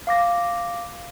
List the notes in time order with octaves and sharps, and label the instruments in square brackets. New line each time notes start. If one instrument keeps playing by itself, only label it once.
[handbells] F5 D6 A#6